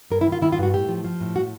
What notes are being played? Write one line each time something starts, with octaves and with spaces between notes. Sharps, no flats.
G2 A#4
E4
D#3
F4
D#3 E4
F4
G2 F#4
A2 G4
F3
F3
A2
F#4